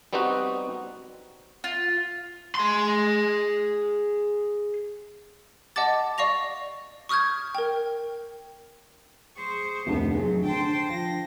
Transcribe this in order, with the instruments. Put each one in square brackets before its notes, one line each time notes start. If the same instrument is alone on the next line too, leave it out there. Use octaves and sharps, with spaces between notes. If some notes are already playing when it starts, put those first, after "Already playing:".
[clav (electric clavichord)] G3 B3 C4 D#4 F#4
[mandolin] F4
[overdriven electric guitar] G#4 C6
[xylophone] D#5 F#5 A5 D6 A6
D5 F5 C#6 A#6 F7
C#6 D#6 F6 G6 G#6
A#4 G5
[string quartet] G#4 C5 C#6
[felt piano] F1 D2 D#3 [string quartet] A2 B3
[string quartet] F#3 [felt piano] G#4
[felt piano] D3 [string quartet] C5 G5 A5
[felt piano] F3 [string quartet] A#6